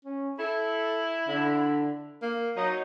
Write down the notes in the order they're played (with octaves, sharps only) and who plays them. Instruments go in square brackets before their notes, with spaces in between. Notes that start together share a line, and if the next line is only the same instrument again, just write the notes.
[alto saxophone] C#4
[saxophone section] E4 [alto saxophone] A4
[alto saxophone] D3
A#3
[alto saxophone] F#3 [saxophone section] D#4